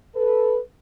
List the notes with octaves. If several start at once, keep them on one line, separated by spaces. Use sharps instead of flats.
A4 B4